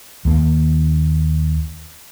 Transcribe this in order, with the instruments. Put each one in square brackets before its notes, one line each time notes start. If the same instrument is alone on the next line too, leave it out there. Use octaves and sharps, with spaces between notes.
[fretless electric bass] D#2 A#3